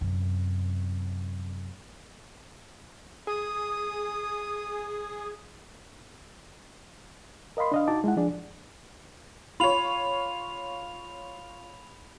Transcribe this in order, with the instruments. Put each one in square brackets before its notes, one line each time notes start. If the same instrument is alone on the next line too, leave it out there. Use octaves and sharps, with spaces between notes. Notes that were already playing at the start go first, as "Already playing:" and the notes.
[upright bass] F#2 C3
[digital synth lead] G#4 [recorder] D#6
[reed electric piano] A#4 D#5 F5 B5 C6
D4 D#5 F5
D#4 F#4 A5 D6
G#3 E4 F#5
F3 D4 G#4 D5
[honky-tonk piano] F4 C#5 [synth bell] B5 F7